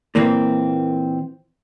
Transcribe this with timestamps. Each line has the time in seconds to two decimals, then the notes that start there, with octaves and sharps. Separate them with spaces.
0.15 A#2 E3 A#3 C4